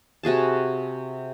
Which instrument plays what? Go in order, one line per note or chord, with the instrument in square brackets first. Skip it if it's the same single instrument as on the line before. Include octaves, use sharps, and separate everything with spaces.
[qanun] C3 F#4 G#4 A5